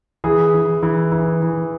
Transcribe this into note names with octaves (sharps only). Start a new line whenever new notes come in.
E3 G#4
E3
E3
E3
E3